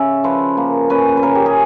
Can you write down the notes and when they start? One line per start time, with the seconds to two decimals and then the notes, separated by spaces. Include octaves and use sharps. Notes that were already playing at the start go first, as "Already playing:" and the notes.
Already playing: C#3 C#4 E5
0.24 F3 B4
0.57 A#3
0.90 C#4 B4
1.17 B4
1.23 C#3 A#4
1.35 G4
1.46 G#4